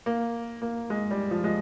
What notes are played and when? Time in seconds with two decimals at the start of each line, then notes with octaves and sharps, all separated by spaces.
0.06 A#3
0.62 A#3
0.90 G#3
1.11 G3
1.31 F3
1.44 G#3